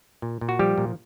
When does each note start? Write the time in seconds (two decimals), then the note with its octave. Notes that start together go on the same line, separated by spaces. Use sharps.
0.22 A#2
0.41 A#2
0.49 F#4
0.59 F3 G3 G4
0.78 A#2